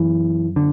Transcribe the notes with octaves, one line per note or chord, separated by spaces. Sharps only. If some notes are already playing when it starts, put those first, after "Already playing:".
Already playing: F#2 E3
D3